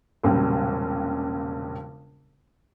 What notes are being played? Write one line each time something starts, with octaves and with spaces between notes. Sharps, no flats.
E1 A#1 C#3 G3